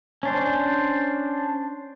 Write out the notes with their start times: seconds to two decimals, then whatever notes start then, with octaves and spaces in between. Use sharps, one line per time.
0.23 C#4 D4 C5